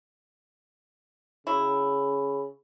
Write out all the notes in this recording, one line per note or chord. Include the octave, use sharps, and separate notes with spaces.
C#3 F#3 E4